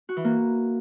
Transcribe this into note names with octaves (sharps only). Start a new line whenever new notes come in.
F#4
E3
A#3